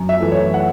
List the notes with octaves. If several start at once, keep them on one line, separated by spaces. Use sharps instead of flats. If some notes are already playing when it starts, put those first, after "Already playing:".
Already playing: F#2
E5
E3 A3
C#5
F#5